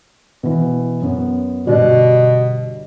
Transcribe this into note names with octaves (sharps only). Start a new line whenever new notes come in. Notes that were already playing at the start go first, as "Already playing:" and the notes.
B2 E3
F#2 B3
G1 B2 G3 D5